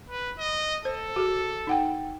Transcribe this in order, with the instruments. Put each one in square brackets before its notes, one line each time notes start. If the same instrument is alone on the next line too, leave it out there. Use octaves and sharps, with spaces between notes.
[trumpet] B4
D#5
[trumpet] A4 [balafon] C5
[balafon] F#4 G#4
D#4 F#5 G5